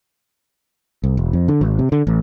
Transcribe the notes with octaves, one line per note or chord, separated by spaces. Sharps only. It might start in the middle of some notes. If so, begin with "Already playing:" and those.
C2
E1
F2
D3
G#1
C3
D3
A1